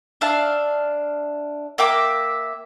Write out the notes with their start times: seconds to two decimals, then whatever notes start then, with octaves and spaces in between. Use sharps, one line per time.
0.21 D4 E5 F5 A5
1.78 A#3 E5 G5 D6